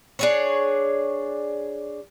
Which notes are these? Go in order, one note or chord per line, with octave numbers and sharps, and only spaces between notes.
D4 G#4 C#5